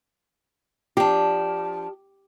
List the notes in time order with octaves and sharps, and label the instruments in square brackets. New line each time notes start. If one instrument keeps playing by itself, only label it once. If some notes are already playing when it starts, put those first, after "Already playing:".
[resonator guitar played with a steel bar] F3 D4 [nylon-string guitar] G4